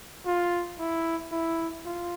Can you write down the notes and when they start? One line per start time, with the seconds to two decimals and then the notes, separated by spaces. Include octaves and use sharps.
0.26 F4
0.79 E4
1.32 E4
1.86 F4